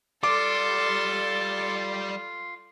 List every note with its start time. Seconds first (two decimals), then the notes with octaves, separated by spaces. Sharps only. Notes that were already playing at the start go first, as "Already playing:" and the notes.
0.23 G3 F4 A4 D5 C6 D6